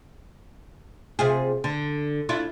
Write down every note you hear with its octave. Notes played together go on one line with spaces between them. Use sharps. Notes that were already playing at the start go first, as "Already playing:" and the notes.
C3 F4 G#4
D3
D4 E4 F4